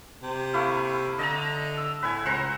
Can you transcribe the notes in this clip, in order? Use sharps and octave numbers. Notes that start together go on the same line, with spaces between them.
C3
A3 A#3 E4
D3 D#5 A5 A#5
E6
A2 B4 E5 G#5
C#2 C5 F#5 A#5